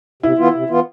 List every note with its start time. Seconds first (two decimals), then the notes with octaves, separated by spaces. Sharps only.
0.23 C3 E4
0.38 E3 B3 F4
0.54 C3
0.70 E3 B3 F4